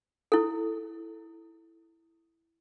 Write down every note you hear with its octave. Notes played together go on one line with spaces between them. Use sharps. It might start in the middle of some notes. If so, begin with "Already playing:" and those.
E4 A4